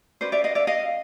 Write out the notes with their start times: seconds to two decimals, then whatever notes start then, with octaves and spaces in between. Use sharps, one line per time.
0.21 C#4 F#4 B4 C5 D5
0.32 D5 E5
0.44 D#5 F5
0.55 D5 E5
0.67 D#5 F5